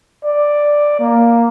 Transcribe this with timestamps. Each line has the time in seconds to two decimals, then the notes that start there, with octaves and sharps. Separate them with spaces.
0.25 D5
1.00 A#3